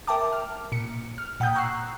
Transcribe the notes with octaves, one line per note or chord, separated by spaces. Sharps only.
A#4 E5 G5 A5 D6
F6
A#2 C#7
F6
A#2 F#5 G5 D#6 G6
A#5 C#6 E6 F#6 C7